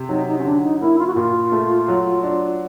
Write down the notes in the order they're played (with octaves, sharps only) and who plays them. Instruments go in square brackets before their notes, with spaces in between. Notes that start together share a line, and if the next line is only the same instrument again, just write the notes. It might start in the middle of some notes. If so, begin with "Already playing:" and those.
Already playing: [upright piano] C3
[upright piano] F#3 [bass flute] D#4
[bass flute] D#4
C#4
[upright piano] D3 [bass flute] D4
[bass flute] D#4
[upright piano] A#3 [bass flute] E4
[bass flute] F4
F#4
[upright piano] A#2 [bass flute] F4
[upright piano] A3
F#3
D4